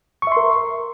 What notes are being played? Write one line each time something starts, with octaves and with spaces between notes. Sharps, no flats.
A#4 E5 C6 C#6